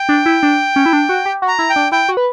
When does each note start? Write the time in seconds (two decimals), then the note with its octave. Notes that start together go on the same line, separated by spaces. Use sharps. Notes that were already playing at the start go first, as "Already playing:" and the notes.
Already playing: G5
0.09 D4
0.26 E4
0.43 D4
0.76 C#4
0.86 E4
0.93 D4
1.09 F#4
1.26 G4
1.42 F#4
1.48 A#5
1.59 E4
1.70 G5
1.76 D4
1.92 E4 G5
2.09 F#4
2.17 B4